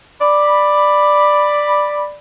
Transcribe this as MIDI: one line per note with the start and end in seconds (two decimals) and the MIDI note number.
0.21 2.16 74
0.21 2.16 83